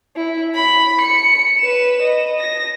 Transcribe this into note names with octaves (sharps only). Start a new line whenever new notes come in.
E4
B5
C#7
B4 E7
D#5
A#6